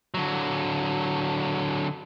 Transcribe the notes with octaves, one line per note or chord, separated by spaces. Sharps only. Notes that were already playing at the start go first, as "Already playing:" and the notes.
D3 F#3